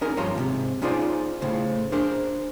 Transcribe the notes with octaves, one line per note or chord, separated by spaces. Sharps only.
C#4 D#4 G#4 A#4
G2 F3 C#5 A5 A#5 C6
E2 G#2 C3
C#4 D#4 F4 G#4 C5 D5
A2 C#3 C5
D4 G#4 A#4 C5